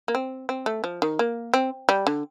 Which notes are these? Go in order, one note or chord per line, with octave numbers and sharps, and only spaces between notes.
A#3
C4
C4
A3
F3
D#3
A#3
C4
G3
D3